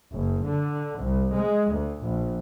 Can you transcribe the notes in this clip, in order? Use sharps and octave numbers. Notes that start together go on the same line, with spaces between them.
F#1
D3
C2
G#3
D2
A#1